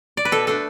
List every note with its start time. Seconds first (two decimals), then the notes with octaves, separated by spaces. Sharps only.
0.17 D5
0.25 B4
0.32 B2 A4
0.47 A3 D4 A4